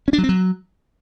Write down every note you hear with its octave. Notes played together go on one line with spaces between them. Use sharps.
C#4
D4
F#3
C4
F#3